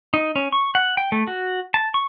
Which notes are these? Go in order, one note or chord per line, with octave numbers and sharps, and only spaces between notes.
D#4
C#4
C#6
F#5
G5
A3
F#4
A5
C#6